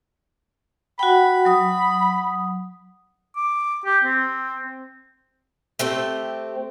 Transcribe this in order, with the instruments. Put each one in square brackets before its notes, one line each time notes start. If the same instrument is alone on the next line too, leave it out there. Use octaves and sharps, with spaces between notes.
[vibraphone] F#4 F#5 G5 [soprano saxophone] B5
[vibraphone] F#3 D#6
[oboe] D6
G4
C4
[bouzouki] A3 C4 G4